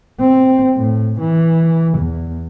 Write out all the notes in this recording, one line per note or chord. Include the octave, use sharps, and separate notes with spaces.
C4
A2
E3
E2